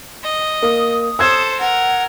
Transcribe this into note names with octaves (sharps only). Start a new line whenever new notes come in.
D#5
A#3 D#6
A4 C5 E6 G#6
A#4 F#5